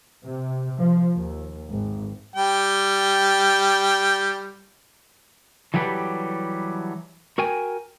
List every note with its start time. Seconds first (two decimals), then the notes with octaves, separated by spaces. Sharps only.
0.24 C3
0.79 F3
1.14 D#2
1.69 G#1
2.36 G3 G5
5.74 E3 F#3 G3 G4 A4 B4
7.38 F#4 A#4 G5 G#5